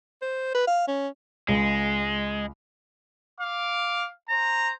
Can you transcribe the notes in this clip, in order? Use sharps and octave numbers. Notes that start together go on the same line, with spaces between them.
C5
B4
F5
C#4
C#2 G#3
F5 D6
C5 A#5